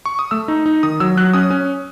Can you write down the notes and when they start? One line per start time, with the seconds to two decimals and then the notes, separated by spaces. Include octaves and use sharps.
0.06 C#6
0.19 D#6
0.31 A3 E6
0.48 D#4
0.66 D#4
0.83 D#3 D#6
1.00 F#3 E6
1.17 F#3 F#6
1.33 C#4 D#6
1.51 C#4